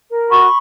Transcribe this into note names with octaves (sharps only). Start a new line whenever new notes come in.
A#4
F#4 B5 C#6